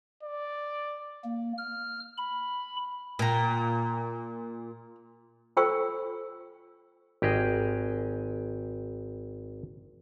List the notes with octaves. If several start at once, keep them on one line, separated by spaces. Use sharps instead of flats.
D5
A#3
F6
B5
A#2 G5 A#5
F4 A4 C5 G5 C#6 E6
G#1 G4 G#4 D#5